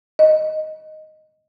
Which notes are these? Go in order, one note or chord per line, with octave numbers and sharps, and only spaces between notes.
D#5